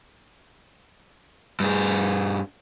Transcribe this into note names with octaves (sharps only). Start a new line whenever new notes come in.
G2 G#4